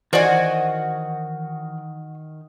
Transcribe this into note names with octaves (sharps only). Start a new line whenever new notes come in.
D#3 E3 F#4 C5 D5 D#5 G#5